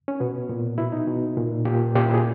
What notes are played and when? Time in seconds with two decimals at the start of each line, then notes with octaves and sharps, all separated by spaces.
0.08 C#4
0.20 B2 B3
0.49 A#2
0.78 B2 E4
0.92 D#4
1.08 B2
1.37 A#2
1.65 A#2 G4
1.95 A#2 G4
2.05 E4
2.14 G#4